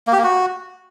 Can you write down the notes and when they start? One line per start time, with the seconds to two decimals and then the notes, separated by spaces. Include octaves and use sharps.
0.07 A#3
0.13 G4
0.18 A#3
0.24 F#4